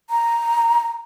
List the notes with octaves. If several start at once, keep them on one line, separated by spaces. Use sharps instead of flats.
A#5